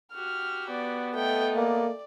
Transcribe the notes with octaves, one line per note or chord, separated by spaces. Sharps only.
F#4 G4 F6
B3 D5
A3 A4 D#5 G5
A#3 D5